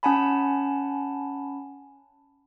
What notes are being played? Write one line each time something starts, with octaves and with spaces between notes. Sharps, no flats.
C#4 F#5 G#5 A5 B5